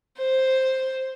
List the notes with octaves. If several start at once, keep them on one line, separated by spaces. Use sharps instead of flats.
C5